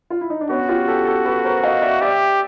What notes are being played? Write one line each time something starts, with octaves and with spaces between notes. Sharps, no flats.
F4
E4
D#4
D4
B3 C#4 F#4
F4 G4
G4 A4
G4 A4
A4 B4
A#4 C5
D#5 F5
D5 E5
G4 D5 E5